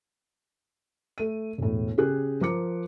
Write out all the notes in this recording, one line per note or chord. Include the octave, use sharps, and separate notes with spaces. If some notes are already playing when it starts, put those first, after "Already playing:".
A3 D#7
E1 A2
C#3 G4 G#4 F#6
F3 A#4 D6 C#7